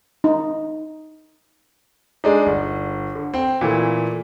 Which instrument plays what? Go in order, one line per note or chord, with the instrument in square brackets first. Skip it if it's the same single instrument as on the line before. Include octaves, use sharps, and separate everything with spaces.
[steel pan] D#4
[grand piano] G#3 D4 D#4
G1
D3
C4 G5
A#2 E3 A3